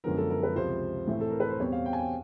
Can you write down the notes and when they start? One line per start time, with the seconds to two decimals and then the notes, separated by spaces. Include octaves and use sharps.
0.04 F#2 D3 F3 G#3 B3 A#4
0.17 A4
0.30 A#4
0.43 B4
0.56 C#2 C3 F3 C5
1.07 A2 E3 A3 C4
1.21 A4
1.30 A#4
1.40 B4
1.50 C5
1.60 E2 B2 G3 C4 C#5
1.72 F5
1.86 G5
1.93 G#5
1.99 G5